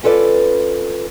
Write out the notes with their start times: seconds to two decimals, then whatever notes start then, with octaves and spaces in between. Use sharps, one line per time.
0.03 C#4 F4 A4 B4 D5